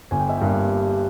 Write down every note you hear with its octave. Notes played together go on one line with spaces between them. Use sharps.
G1 G#5
G5
E5
G2 G3 A#3 G5